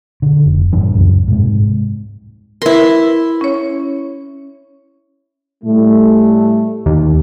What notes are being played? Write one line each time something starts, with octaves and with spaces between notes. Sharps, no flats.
D3
F1
D#1 G2 E3 D4
C#2 F#2
G#2 C3 G#3
E4 A#4 B4 C6
C#4 C#5
A2 G3 A3
D#2